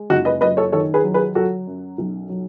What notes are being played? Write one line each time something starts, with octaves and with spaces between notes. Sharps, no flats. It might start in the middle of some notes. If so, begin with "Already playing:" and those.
Already playing: G#3
F#1 D#4 F#4
B4 D#5
F#2 B4 D#5
A4 C#5
D#3 A4 C#5
G#4 B4
F#3
G#4 B4
F#3 F#4 A4
F#2
B1
F#3